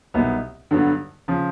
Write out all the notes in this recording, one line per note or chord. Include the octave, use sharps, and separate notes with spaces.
C2 B2 F#3 B3 D#4
G2 D3 F#3 B3
C#3 F3